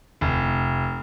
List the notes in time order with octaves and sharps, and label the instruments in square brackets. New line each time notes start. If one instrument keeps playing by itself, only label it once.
[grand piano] F1